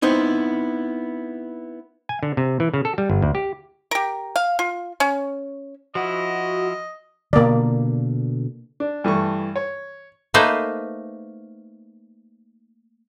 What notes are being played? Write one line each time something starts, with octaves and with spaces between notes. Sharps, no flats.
B3 C4 D#4 E4
G#5
D3
C3
E3
C#3
A4
G3
G1
D2
G4
G4 A#4
F5
F4
C#4
F3 E4 F#4 D#5
B2 D3 A#3 D5
D4
G2 E3 A3 C#6
C#5
A3 A#3 D#4 B4 C5